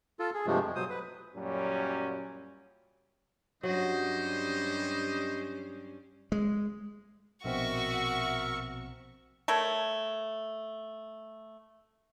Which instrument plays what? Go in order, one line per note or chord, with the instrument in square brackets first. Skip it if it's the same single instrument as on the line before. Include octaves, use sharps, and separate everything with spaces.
[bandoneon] F4 A4
G#4
G2 C3 F3 G#3 A3
F2
B2 F#3 C5 D#6
B4
[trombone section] F#2 A#2 F#3 G3 C#4
[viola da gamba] G2 G3 C#4 [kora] F#3 F#4 [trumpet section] C5 D#5
[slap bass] G#3
[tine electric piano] A#1 B2 C4 [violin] F#4 C#6 [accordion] A#4 E5 E6
[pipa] A3 A#4 C#5